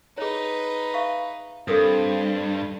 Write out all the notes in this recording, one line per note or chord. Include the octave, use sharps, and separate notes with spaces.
D#4 G#4 B4 C#5
E5 F5 C#6
G2 C4 A4 A#4 D#6